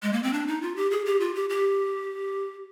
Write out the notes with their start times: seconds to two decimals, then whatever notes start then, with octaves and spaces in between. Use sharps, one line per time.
0.03 G#3
0.13 A#3
0.23 C4
0.33 D4
0.47 D#4
0.62 F4
0.76 G4
0.91 G#4
1.06 G4
1.20 F4
1.35 G4
1.49 G4